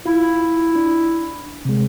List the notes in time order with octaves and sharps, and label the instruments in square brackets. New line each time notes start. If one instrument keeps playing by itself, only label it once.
[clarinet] E4 [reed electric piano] F4
[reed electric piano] D4
C3 G#3